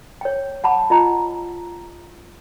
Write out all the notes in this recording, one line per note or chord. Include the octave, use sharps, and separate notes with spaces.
C#5 G5
F#5 A5 B5 D6
F4 D#5 A#5